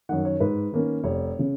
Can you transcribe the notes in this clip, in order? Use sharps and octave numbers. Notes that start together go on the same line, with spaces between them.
F#2 D#3 F#5
C#5
G#2 B4
D#3 A#3 C#4
F1 C#5
C#3